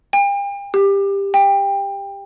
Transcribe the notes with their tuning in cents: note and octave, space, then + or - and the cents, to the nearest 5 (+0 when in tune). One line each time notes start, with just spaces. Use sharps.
G5 +40
G4 +15
G5 +20